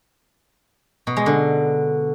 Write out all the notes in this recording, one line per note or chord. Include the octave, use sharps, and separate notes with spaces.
B2
G#3
D3